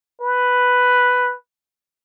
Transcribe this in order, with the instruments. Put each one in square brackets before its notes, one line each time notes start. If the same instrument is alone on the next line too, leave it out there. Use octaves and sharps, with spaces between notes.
[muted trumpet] B4